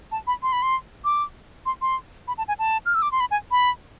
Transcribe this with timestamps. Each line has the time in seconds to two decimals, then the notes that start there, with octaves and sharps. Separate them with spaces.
0.12 A5
0.27 B5
0.43 C6
0.53 B5
0.62 C6
1.05 D6
1.66 C6
1.82 C6
2.28 B5
2.38 A5
2.48 G#5
2.59 A5
2.86 F6
2.95 E6
3.02 D6
3.12 C6
3.20 B5
3.31 G#5
3.51 B5